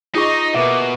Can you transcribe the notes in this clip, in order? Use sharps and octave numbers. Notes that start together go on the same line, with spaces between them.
D#4 F4 G#4 D#5 C6 C#6 D#6
B2 A#3 B4 E5 D6